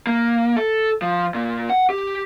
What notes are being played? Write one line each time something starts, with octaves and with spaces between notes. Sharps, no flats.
A#3
A4
F3
A#2
F#5
G4